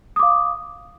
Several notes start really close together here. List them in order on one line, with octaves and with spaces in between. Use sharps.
D#6 D6 F5